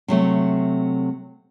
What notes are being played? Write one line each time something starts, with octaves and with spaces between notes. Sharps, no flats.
C3 F#3 A3